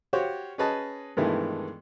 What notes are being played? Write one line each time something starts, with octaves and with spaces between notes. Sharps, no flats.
F#4 G4 C5 C#5 F5
C#4 G#4 B4 D#5 A5
G2 B2 D#3 E3 G#3 A3